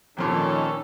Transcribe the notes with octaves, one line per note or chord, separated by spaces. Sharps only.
G#1 F2 A#2 D#3 C#4 A4